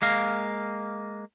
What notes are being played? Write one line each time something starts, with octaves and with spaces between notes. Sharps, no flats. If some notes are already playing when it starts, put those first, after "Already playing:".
G#3 A#3 F5